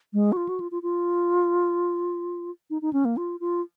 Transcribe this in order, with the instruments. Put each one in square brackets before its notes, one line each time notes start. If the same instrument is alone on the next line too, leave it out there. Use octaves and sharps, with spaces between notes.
[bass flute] G#3
F#4
F4
F#4
F4
F4
F4
D#4
D#4
C#4
A#3
F4
F4